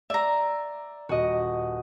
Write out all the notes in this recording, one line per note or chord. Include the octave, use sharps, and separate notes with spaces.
D5 E5 A#5
D#1 F#4 D#5